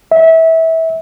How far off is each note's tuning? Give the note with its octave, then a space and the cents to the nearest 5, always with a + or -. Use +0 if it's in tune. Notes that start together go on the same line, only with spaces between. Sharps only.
E5 -25